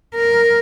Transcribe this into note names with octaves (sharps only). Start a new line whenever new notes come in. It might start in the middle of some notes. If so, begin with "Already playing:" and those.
A#4